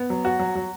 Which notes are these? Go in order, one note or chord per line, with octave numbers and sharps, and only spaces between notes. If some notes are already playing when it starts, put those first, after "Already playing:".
Already playing: B3
F#3
F#4
F#3
F#3